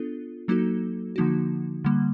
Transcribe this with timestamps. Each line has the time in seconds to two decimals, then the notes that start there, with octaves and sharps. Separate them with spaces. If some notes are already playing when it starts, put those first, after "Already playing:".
Already playing: B3 D4 F4 A4
0.48 F#3 A#3 D#4 F#4 A4
1.16 D3 F3 A#3 D#4 F#4
1.84 D3 G3 A#3